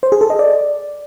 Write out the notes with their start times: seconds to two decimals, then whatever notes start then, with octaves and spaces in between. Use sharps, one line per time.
0.03 C5
0.12 G#4
0.21 A4
0.30 D#5
0.39 D5